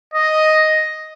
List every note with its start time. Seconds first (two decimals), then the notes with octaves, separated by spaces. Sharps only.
0.13 D#5